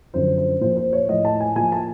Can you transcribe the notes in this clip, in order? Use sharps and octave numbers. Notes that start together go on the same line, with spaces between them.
F#2 D3 F3 C5
C5
A#2 F3 C5
C5
C#5
A2 F3 D#5
A5
G#5
A#2 F3 G#5
A5